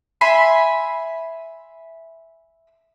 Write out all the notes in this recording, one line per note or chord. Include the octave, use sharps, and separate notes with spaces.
E5 G#5 B5 C6